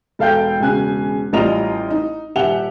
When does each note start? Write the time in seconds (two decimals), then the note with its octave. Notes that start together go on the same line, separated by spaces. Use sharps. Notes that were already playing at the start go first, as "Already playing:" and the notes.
0.19 E1 A4 F5 G5 G6
0.60 E1 C#3 G#5 F#6
1.33 A1 G3 F4 D#5 A#5 F7
1.90 D#4
2.36 D#1 G4 E5 F#5 F7 G7